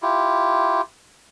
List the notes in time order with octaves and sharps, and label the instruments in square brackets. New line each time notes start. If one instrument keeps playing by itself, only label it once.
[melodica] E4 F4 G4